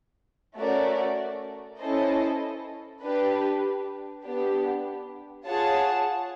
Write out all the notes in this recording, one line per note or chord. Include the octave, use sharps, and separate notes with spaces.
A3 C#4 F#4 A#4 D5
C#4 E4 A4 C5 D#5
D4 G4 B4
B3 D4 G4
F4 G#4 C#5 F#5 A5